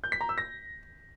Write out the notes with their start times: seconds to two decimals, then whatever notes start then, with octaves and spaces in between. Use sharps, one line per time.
0.04 G6
0.12 B6
0.21 A#5
0.29 E6
0.38 A#6